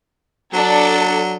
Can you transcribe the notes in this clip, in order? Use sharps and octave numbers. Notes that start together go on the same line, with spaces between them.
F#3 D4 A4